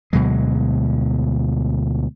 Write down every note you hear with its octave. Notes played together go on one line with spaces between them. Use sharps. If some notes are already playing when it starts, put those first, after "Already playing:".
D2 B2 F#3 G#3